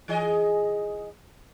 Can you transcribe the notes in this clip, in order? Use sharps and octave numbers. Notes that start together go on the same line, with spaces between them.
E3 G#4 D#5